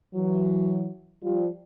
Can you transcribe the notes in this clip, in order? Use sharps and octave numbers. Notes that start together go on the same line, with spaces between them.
E3 F#3
F3 G3